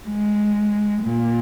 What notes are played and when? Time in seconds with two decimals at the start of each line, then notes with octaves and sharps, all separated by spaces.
0.08 G#3
1.03 A#2